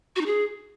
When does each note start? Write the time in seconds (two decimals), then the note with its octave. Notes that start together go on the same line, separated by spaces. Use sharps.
0.16 F#4
0.21 D#4
0.26 G#4